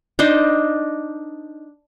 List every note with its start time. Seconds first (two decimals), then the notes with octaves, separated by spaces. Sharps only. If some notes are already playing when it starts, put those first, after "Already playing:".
0.19 D4 D#4 C5 D#5